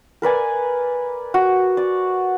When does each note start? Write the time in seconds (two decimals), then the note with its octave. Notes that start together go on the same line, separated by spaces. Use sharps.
0.22 A#4 B4 D5 G#5
1.34 F#4
1.77 D5